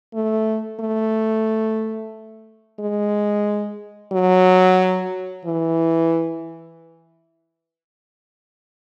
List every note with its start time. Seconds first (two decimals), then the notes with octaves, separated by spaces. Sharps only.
0.14 A3
0.80 A3
2.80 G#3
4.12 F#3
5.45 E3